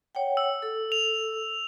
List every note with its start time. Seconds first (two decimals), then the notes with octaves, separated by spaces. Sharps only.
0.15 C#5 F#5 G5
0.37 E6
0.62 A4
0.92 F7